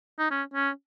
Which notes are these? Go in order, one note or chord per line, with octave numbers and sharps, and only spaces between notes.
D#4
C#4
C#4